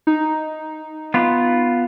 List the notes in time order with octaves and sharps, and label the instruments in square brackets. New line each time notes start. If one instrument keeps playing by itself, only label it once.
[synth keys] D#4
[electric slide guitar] B3 F4